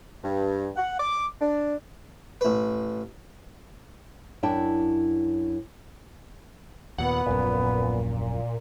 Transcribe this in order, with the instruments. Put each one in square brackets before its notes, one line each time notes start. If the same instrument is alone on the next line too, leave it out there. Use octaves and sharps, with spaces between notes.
[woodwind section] G2
F#5
D6
D4
[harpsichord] A1 B4
[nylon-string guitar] F#2 D4 E4 G5 A5
[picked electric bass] D#2 A#2 [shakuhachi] B3 [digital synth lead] F#5
[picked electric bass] D#1 A#1 F#2 [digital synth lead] A#2